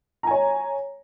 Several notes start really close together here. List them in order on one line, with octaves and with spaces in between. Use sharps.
A#5 G#5 C#5